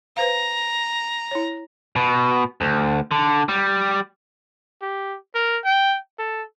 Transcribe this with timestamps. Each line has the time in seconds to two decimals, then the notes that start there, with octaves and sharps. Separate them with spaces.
0.17 B4 C5 F5 A#5
1.31 E4 C#5
1.96 B2
2.61 D2
3.11 D3
3.49 G3
4.82 G4
5.35 A#4
5.65 G5
6.18 A4